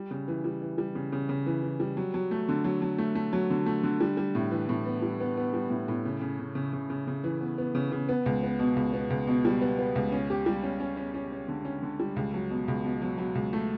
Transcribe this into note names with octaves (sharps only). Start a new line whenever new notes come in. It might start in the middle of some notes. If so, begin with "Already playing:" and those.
Already playing: G3
C#3
E3
G3
E3
G3
C#3
C#3
C#3
E3
E3
G3
F#3
F#3
A3
D3
F#3
F#3
A3
A3
F#3
D3
A3
D3
G3
G3
A2
E3
A2
B3
G3
B3
B3
G3
A2
A2
C#3
C#3
C#3
C#3
C#3
C#3
C#3
E3
B3
B3
C#3
C#3
B3
C#2
B3
B2
C#2
B3
C#2
B2
G3
B3
B3
C#2
C#4
G4
G3
C#4
C#4
C#4
C#4
C#4
D3
C#4
D3
G3
C#2
F#3
B2
C#2
B2
F#3
F#3
C#2
A3